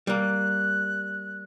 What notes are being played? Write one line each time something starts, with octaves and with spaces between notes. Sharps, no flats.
G3 A#3 F#6